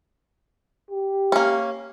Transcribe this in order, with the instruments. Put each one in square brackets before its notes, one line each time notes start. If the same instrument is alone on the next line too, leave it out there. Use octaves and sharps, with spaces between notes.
[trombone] G4
[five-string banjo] A#3 C#4